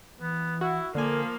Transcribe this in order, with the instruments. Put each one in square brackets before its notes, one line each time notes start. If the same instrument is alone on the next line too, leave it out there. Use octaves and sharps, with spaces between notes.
[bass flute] E3 [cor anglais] B3
[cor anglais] E4 [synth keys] F#4
[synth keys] D3 G#5 [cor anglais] F3 [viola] A#3 [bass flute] A#4